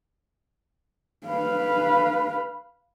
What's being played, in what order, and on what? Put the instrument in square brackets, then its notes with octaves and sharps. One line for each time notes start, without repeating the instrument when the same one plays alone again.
[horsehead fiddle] B4 F5